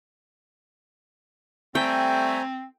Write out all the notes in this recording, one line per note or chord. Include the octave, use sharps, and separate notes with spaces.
G3 A3 C4 C5 G5 G#5 A#5